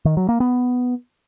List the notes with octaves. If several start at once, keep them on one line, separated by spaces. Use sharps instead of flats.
D#3
F#3
A#3
B3